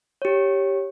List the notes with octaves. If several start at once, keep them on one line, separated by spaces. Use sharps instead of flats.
G4 C#5